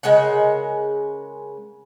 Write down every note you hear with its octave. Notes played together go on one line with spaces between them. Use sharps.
C#3 G#3 A#4 F#5